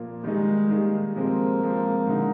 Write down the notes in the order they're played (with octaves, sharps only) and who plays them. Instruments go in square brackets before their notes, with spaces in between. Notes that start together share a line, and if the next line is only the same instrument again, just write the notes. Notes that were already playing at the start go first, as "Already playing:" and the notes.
Already playing: [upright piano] A#2 F3 A#3 F4
[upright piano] D#3 G3 A#3 D#4 G#4 [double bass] G#3
[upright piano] D#3 G3 A#3 D#4 G#4
[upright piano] C3 F3 G#3 C4 [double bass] A#3
[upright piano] C3 F3 G#3 C4
D3 G#3 D#4